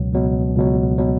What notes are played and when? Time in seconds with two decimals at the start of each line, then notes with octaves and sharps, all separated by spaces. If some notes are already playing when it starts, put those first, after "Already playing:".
Already playing: C#2 B2 F#3
0.13 C#2 B2 F#3
0.56 C#2 B2 F#3
0.98 B2 F#3